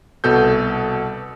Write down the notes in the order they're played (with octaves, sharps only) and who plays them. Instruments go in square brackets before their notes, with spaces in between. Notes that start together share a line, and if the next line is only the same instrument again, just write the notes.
[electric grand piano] C2 B2 A4 G6